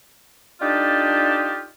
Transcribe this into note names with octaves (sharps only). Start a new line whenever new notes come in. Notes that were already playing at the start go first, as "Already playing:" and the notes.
D4 D#4 F4 G4 A4 D#5